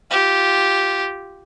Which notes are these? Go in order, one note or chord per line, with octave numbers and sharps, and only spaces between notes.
F4 G4